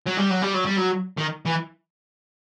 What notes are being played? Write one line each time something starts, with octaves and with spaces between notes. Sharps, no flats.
F#3
G3
F#3
G3
F#3
G3
F#3
D#3
E3